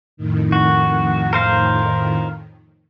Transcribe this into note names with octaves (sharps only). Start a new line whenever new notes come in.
F2 A2 D#3
F#4
A#4 C5 F5